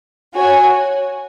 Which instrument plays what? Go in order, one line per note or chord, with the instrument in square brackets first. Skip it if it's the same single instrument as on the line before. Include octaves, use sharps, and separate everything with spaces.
[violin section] F#4 C#5 G#5